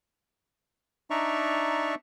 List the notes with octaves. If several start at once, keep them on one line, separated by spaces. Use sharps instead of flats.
D4 D#4 D5 E5 A#5 C#6